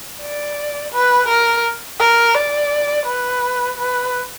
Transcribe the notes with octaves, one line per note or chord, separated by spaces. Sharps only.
D5
B4
A#4
A#4
D5
B4
B4